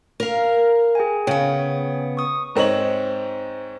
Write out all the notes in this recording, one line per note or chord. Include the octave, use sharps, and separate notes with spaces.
A#4 F5
G#4 G5 G#5
C#3 B3 G#4 C#5 G5
C#6 D#6
G#2 C4 D#4 C#5 F#7